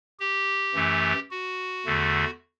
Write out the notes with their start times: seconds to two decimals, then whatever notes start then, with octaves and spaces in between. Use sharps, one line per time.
0.20 G4
0.74 F#2 E3 A3
1.31 F#4
1.86 E2 D3 A3